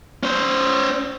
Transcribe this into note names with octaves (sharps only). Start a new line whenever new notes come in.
C#4 C5